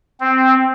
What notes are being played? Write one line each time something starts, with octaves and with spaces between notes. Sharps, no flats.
C4